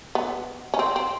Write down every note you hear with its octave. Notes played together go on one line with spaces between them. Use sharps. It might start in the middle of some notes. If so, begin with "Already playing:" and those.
B3
C#4
C4
C4